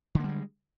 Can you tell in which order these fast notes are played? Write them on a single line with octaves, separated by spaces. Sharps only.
D3 A#3 G3 G#3